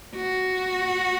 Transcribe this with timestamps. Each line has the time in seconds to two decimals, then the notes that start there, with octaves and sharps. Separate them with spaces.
0.15 F#4